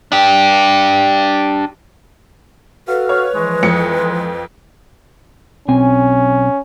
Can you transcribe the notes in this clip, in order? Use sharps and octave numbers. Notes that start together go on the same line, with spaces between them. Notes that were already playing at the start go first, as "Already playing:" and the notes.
D4 G4
F#4 A4 B4 F5
C#5
E3 F3 G#3
F2 C#7
B1 C4 C#4 G#5